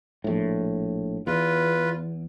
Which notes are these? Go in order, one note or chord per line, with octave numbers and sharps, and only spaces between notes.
A#1 A2
E2 F4 B4